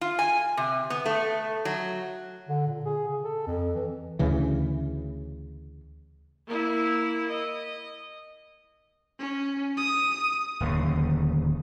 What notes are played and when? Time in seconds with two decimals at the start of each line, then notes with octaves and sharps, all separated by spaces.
0.01 F4
0.19 G#5
0.57 C3
0.90 B3
1.06 A3
1.65 F#3
2.49 D3
2.68 A#2
2.85 G#4
3.09 C#3
3.24 A4
3.47 F2
3.75 E3
4.19 D2 C#3 E3
6.47 A#3 E4
7.31 D#5
9.20 C#4
9.77 D#6
10.60 D1 D#2 C#3